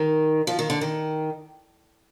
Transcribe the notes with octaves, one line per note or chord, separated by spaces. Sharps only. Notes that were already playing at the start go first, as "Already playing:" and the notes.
Already playing: D#3
F3
D#3
D3
D#3